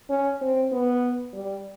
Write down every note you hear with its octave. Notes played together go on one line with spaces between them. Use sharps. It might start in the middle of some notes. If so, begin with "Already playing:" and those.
C#4
C4
B3
G3